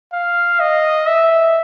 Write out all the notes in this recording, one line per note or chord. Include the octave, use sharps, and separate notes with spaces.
F5
D#5
E5